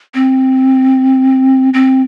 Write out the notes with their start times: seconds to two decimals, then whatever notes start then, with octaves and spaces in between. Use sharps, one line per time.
0.14 C4
1.74 C4